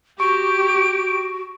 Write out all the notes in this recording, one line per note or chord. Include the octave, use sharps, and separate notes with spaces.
F#4 G4 C#6 D7